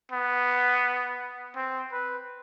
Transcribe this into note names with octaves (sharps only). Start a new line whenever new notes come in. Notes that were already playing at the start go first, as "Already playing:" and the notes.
B3
C4
B4